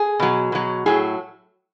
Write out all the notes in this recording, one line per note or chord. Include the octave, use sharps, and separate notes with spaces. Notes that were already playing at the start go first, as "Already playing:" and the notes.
Already playing: G#4
B2 F#3
B2 F#3
A2 F#3 G#4